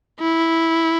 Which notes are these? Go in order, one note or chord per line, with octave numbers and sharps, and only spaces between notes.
E4